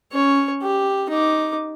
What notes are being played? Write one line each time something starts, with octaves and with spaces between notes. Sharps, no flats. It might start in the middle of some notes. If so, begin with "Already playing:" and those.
C#4 C#5
G4
D#4 D6